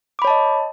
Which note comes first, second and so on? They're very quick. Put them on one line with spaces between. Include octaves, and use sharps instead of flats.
D6 B5 C#5 A5 D#5